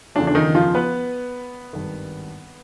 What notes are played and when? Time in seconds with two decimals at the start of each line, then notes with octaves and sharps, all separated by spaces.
0.15 E2 C#3 F3 A3 D4
0.27 D4
0.35 D#3 D#4
0.55 F3 F4
0.75 B3 B4
1.73 G#1 G2 D#3